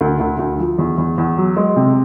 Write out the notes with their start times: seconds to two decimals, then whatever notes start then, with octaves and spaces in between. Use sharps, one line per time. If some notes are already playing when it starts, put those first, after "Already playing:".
0.01 D2
0.20 D2
0.39 D2
0.59 F3
0.78 E2
0.98 E2
1.18 E2
1.37 F#3
1.57 G#3
1.76 C3